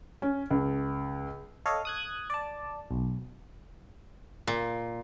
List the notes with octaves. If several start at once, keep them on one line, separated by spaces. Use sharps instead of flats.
C#4
C#2
A4 C#5 D#5 F5
D#6 F#6 G#6
D5 A5
B1
A#2